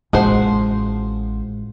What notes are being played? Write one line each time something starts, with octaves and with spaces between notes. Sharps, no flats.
A1 F3 G#3 F#4 C5